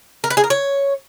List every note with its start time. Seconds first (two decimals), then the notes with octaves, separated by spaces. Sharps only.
0.24 A#4
0.30 B4
0.37 G#4
0.44 A#4
0.50 C#5